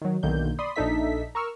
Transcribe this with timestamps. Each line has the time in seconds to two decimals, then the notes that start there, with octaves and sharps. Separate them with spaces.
0.01 D#3 F#3
0.23 B1 D3 D#3 A#3 G6
0.59 D5 B5 C6 D#6
0.76 A#1 D4 D#4 A4 E5 B6
1.35 A#4 C#6 E6 F6